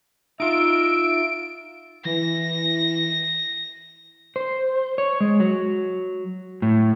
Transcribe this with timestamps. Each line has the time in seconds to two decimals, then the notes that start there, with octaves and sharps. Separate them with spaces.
0.40 D#4 F4 E5 D7
2.05 E3 A#6
4.36 C5
4.98 C#5
5.21 G#3
5.40 F#3
6.62 A2